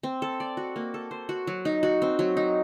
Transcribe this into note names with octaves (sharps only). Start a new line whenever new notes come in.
C4
A4
D5
F#4
A#3
A4
C5
F#4
F#3
D#4
F#4
C4
F#3
D#4